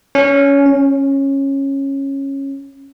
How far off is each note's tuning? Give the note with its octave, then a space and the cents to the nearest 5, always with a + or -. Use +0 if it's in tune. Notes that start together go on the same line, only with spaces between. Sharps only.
C#4 +15
C#4 -15